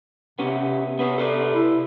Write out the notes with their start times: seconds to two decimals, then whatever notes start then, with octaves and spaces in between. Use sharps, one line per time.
0.39 C3 B3 C#4 G4
0.99 B3 B4 C#5
1.18 A4 B4 D5
1.54 E4